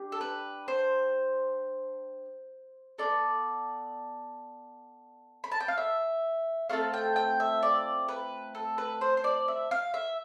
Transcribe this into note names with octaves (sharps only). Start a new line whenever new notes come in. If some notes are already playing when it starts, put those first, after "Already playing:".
Already playing: D4 G4
A4
B4
C5
B3 F4 A4 D5
B5
A5
G5
F5
E5
A3 C4 F4 A4 F5
G5
G5
E5
D5
B4
A4
B4
C5
C5
D5
E5
F5
E5